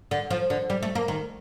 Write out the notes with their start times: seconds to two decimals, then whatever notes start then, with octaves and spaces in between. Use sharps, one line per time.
0.11 D3
0.30 F3
0.50 D3
0.70 G3
0.83 A3
0.95 A#3
1.08 D#3